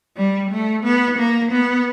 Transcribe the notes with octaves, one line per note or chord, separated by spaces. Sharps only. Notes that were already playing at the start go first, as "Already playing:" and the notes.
G3
A3
B3
A#3
B3